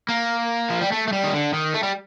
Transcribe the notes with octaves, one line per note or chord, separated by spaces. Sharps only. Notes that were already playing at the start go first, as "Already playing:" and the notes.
A#3
F3
G3
A3
A3
G3
D#3
D3
D#3
A3
G3